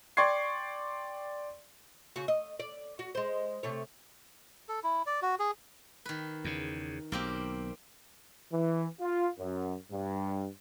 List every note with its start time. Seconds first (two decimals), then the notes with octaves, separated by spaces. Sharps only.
0.17 D5 G5 C6 C#6 G#6 C7
2.16 C#3 F#4
2.28 D#5
2.60 D5
2.99 F#4
3.15 G#3 C5
3.63 C3 A3 C#5
4.69 A4
4.84 E4
5.06 D5
5.22 F#4
5.39 G#4
6.05 D#3 B4
6.44 E2 C#3
7.12 B1 A#3 C4 G4
8.53 E3
9.01 F4
9.39 F#2
9.92 G2